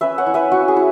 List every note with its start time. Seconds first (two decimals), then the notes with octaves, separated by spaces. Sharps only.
0.01 C#4 B4 E5
0.18 C#5 F#5
0.27 E4
0.34 B4 E5
0.52 C#4 F#4
0.68 G#4
0.76 E4